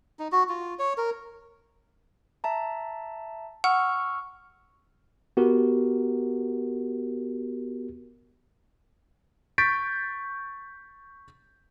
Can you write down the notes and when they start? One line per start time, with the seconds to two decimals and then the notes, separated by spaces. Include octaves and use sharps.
0.19 D#4
0.32 F#4
0.49 F4
0.79 C#5
0.98 A#4
2.44 E5 A5 A#5
3.64 F#5 C#6 E6 F6
5.37 B3 F#4 G4 A#4
9.58 C#6 G6 A6 B6 D7